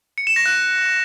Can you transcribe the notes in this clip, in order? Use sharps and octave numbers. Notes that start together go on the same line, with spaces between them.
C#7
E7
A#6
F#6